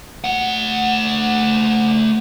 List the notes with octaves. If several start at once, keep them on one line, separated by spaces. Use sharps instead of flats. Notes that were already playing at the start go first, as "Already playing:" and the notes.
A3 F#5